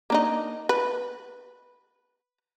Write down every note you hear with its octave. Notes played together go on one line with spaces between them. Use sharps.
A#3 D4 D#4
B4